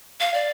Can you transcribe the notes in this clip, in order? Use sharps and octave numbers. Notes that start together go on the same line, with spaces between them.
F5
D5